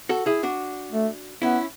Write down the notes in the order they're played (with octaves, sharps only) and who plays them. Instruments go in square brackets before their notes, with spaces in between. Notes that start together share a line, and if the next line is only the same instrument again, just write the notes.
[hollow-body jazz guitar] F#4 A4
E4 G#4
D4 F#4
[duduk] A3
[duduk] B3 [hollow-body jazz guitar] C#4 E4